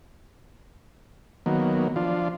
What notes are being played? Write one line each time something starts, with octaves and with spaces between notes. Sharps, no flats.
D#3 F#3 A#3 B3
F3 D4 F4